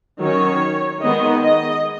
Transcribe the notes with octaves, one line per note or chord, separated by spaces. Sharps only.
D#3 F#3 C#4 C#5
D#3 G#3 B3 D#5
D#5